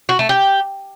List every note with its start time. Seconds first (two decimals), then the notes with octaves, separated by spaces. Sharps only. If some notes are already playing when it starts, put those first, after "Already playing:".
0.09 F#4
0.19 A3
0.29 G4